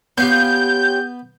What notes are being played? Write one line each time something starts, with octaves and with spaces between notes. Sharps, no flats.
B3 C#4 F4 G4 G6